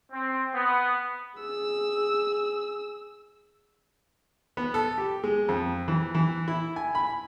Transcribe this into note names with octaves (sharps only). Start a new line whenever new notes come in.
C4
B3
G#4 E6
B3
A4
G4
G#3
F2
E3
E3
E4
G#5
B5